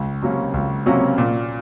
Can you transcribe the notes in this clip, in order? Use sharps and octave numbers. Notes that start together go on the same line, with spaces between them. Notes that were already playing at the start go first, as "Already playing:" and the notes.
Already playing: C#2
C3 F#3 A#3 C#4
C#2
C3 F#3 A#3 C#4
A#2